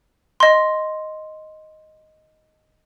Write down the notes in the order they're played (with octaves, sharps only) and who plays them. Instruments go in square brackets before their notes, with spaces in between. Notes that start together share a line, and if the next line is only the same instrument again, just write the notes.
[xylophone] D#5 C6